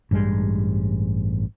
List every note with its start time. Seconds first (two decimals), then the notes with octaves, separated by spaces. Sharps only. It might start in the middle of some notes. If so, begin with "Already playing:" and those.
0.11 A1 G2 G3 G#3